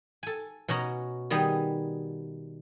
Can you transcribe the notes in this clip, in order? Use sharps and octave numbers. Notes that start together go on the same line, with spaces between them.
A4 G#5
B2 C#4 F#4 F#5 A#5
D#3 G3 B3 G#4